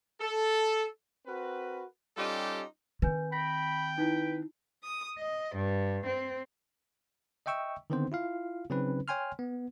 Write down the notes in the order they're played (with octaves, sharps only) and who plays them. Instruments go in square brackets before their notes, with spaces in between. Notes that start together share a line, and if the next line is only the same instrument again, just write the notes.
[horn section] A4
C4 F#4 A#4 B4
G3 C#4 D#4 F4 G4 A4
[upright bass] D#3 C4 [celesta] B4 G#5 G6
[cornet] G5 [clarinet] B5 [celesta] A#6 B6
[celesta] D#4 E4 [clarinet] B4
[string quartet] D#6
D#5
G2
C4
[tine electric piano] D#5 E5 G5 C#6 E6
D3 D#3 B3 C4 D#4 C5
E4 F4 F5
C#3 F#3 C4 C#4 D#4 B4
C#5 G5 G#5 C6 F6
B3